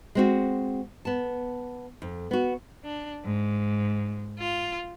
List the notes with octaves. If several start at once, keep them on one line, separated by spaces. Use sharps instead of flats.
G#3 C4 F#4
B3 A5
F2
B3 F#4
D4
G#2
F4